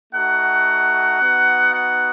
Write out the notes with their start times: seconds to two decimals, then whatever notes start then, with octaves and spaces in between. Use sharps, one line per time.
0.13 A3 D#4 F#4 F#5
1.21 B3 D#4 F#4
1.73 F#5